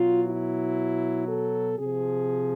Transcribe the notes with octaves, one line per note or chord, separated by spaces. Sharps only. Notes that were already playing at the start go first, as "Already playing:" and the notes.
Already playing: B2 F#3 F4
E4
A4
C3 F3 G#4